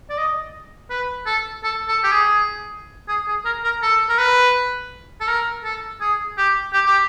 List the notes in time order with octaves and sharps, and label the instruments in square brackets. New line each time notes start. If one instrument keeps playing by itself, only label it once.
[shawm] D5
D#5
B4
A4
A4
A4
G4
G#4
G#4
G#4
A#4
A#4
A4
A#4
B4
A4
A#4
A4
G#4
G4
G4
G4